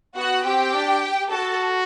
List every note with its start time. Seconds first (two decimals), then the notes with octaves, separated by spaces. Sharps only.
0.17 B3 F#4 F#5
0.45 C4 G4 G5
0.74 D4
1.31 F#4 A4 A5